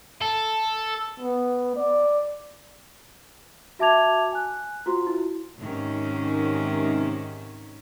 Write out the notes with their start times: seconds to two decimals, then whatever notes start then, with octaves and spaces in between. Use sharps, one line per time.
0.22 A4
1.20 B3
1.76 D5
3.79 F#4 E5 A5 D6 G#6 F7
4.31 G#5 F#6
4.86 F4 F#4 C5 C6
5.07 E4
5.56 G#2 C3 D#3 C#4